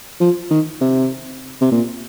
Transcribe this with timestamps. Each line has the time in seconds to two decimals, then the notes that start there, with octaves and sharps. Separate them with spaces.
0.20 F3
0.51 D#3
0.81 C3
1.61 C3
1.72 A#2